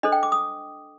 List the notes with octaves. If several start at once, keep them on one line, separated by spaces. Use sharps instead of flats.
D4 A4 C5 D#5
G5
D6
D#6